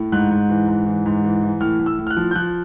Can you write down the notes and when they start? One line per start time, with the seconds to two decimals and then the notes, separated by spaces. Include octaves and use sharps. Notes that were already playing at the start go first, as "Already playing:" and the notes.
Already playing: A2
0.12 G#2 F#6
0.31 G#2
0.49 E3
0.68 G#2
0.87 E3
1.06 G#2
1.24 E3
1.43 E3
1.60 A2 F6
1.80 A2
1.86 E6
1.98 A2
2.07 F6
2.10 F#6
2.17 F3
2.31 G6
2.35 F3 F#6